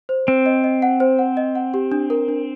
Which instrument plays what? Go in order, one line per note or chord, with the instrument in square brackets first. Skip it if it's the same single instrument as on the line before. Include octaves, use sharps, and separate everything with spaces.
[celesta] C5
[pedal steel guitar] C4 [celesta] C5
[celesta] D#5
D#5
F#5
C5
F#5
D#5
F#5
G4
D4
A#4
D4